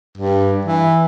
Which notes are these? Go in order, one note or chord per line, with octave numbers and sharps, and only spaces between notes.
G2
E3